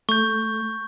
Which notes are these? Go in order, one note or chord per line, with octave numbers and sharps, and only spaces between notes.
A3 C#6 G6